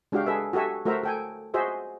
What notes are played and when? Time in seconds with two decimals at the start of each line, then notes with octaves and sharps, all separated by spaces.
0.12 G#3 D4 F#4 G4 F5 G5
0.26 G#4 A4 B4 E5
0.53 F#4 G4 A4 E5 G#5
0.85 A3 F#4 A#4 C5 E5 A#5
1.03 A4 G5 G#5
1.54 F#4 G#4 C5 D#5 E5